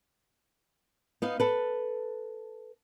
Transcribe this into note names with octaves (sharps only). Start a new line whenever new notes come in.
B3 D#4 F5
A4 B4